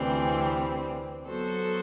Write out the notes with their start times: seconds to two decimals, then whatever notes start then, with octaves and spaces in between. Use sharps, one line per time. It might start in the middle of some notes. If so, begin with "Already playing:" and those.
Already playing: D2 C3 E3 G3 C4
1.28 F#3 B3 F#4 A4 C5